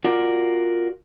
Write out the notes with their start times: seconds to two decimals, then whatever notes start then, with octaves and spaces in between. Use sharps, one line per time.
0.04 F4 F#4 A#4 D5